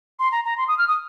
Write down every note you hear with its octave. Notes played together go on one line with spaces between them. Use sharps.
C6
A#5
A#5
C6
D#6
F6
D#6